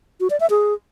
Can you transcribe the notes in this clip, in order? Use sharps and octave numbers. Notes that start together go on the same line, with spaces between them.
F#4
D5
E5
G#4